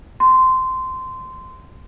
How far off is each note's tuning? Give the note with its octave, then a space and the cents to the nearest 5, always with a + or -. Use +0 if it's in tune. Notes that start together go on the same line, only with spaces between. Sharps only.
C6 -15